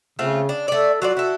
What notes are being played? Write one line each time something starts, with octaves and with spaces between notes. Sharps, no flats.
C#3 A3 C4 F4
D4
A3 A4 D5
F#3 F4 F#4 D5
E4 A4